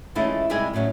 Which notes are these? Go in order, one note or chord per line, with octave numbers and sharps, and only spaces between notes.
E3 G#3 A3 C#4 E4 F4
C3 G3 G#3 E4 G4 G#4
A2 C#3 F#3 C#4 D#4